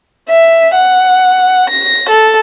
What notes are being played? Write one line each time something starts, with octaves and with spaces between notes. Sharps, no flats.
E5
F#5
A#6
A4